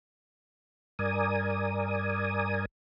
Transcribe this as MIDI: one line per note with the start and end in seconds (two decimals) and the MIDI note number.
0.99 2.65 43
0.99 2.65 70
0.99 2.65 74
0.99 2.65 80
0.99 2.65 87